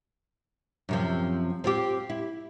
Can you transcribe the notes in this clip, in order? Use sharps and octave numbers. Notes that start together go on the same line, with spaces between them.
F#2 C3 F3
C4 F4 G4
E4